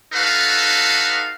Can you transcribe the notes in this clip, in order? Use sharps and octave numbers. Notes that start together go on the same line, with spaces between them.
D#4 F#4 A4 B4 F5